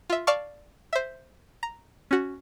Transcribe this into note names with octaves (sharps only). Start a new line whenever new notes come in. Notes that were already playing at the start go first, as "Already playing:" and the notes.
F4 E5
D5 F5 A5 C#6
C5 E5
A#5
C#4 F#4